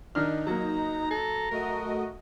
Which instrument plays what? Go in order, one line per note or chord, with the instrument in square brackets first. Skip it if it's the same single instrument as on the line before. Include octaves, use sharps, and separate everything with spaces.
[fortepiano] D#3 D4 F6 [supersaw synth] D#4
[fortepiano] F#3 A#3 [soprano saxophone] A#5
[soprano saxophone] A4 [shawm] A#5
[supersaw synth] A3 F#4 D#5 [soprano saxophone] A#4